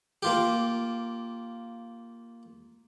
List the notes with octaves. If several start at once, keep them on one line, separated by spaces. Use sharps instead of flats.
A#3 F4 G4